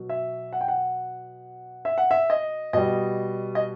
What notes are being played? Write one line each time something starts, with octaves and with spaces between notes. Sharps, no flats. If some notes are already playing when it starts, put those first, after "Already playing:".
Already playing: B2 F#3
E5
F#5
G5
F#5
E5
F#5
E5
D#5
B2 G3 D#5
D#5